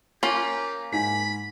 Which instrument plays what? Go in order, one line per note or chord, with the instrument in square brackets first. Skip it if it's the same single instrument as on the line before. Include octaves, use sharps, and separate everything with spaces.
[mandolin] A#3 [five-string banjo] C#4 F4 [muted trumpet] G4
[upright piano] G#2 G#5 B6 [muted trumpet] B5